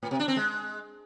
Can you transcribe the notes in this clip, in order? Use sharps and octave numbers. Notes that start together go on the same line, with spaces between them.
A2
C3
D4
C4
G#3